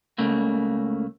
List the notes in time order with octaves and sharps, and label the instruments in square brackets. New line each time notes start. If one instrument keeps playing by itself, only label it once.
[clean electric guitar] C#2 C#3 A3 A#3